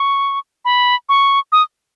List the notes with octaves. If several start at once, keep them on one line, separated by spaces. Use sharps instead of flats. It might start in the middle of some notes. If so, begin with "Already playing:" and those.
Already playing: C#6
B5
C#6
D#6